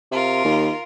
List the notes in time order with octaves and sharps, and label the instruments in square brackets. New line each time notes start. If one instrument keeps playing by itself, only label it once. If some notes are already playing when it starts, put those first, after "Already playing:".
[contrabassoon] C3 [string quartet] F4 A#4
[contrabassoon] D#2